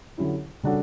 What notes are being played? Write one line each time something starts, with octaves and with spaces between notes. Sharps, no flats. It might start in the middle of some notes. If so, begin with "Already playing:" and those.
D3 F#3 C#4 E4 G4
C#3 G3 D4 F#4 A4